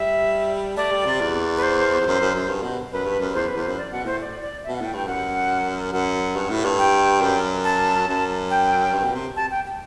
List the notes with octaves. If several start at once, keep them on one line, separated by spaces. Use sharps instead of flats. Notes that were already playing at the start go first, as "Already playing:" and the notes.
Already playing: G3 E5
A3 D5
G3
C3
E2
B4
C5
E2
F#2
F#2
F#2
G2
B2
F#2 B4
G2
F#2
E2 C5
B4
E2
C5
F#2
D5
B2 F#5
A2 C5
D5
D5
E5
B2
F#5
A2 G5
G2 G5
F#2 F#5
F#2 F#5
G2
A2
G2
G5
F#2
A5
F#2
G5
G2
B2
C3
A5
G5
G5